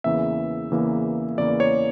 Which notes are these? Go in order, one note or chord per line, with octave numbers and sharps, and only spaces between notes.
E2 C#3 E3 A#3 E5
E2 C#3 E3 A#3
E2 C#3 E3 A#3 D5
C#5